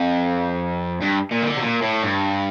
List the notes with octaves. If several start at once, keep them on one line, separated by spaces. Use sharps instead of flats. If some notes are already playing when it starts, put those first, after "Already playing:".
Already playing: F2
G2
A#2
D#3
D3
C3
A#2
A2
G2